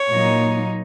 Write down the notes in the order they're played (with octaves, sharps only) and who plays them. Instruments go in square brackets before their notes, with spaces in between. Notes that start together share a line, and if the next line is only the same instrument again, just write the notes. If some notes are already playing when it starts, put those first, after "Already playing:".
Already playing: [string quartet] C#5
[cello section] A#2 F#3 A#3 D#4